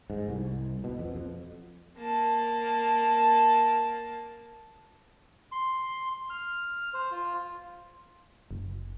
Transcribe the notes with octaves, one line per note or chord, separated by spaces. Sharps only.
G#2
C2
B2
F2
F2
A#3 A5
C6
F6
C5
F4
F#1